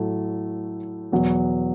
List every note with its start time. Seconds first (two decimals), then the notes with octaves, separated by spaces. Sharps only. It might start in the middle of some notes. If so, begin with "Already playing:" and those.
Already playing: A2 F#3 A3
1.12 E2 B2 F#3